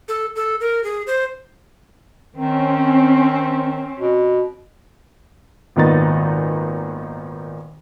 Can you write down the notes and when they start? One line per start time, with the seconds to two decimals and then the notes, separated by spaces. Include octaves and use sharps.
0.08 A4
0.36 A4
0.61 A#4
0.84 G#4
1.07 C5
2.36 D#3 C4 C#4
3.99 B2
5.76 G#1 A#2 D#3 B3 D#4 A6